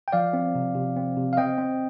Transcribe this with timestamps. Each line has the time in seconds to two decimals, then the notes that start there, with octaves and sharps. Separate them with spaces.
0.08 G5
0.12 F3 D5 F5
0.33 C4
0.55 C3
0.75 C3
0.96 C4
1.17 C3
1.33 F5
1.37 C4 D#5 G5
1.58 C4